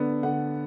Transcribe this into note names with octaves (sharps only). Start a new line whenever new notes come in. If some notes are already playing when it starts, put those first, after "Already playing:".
Already playing: D3 B3 D4
D3 F#5